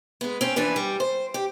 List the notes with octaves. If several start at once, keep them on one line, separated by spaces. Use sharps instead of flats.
G#3 B3
C4 C#4
E3 F3 D4 B4
G3
C5
G4